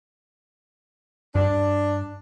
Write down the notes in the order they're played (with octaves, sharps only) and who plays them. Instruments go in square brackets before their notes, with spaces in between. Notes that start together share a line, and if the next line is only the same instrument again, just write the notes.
[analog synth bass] G2 [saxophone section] D4